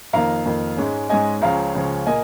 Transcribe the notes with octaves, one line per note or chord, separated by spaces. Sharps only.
F2 D#3 A#3 F5 A#5
F2 D#3 A#3
G#2 G#3 C#4
G#2 G#3 C#4 D#5 G#5
C#2 C#3 F3 C#4 F5 A#5
C#2 C#3 F3 C#4
A#2 A#3 D#5 G#5